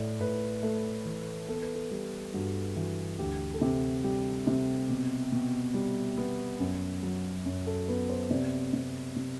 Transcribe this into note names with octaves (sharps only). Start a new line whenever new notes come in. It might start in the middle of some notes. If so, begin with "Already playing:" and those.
Already playing: A2 D5
A2 B4
A3
E3
B3 A4
B4
A4
G3
G2 F#4
E3 F#4
D2 G4
A4
C3 G4
G3 G4
C3
B2
B2
G3
B3
F#2
F#3
F#2
A4
B3 B4
C5
C3 D5
C3
C3